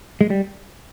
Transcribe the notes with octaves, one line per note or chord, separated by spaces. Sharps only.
G#3
G3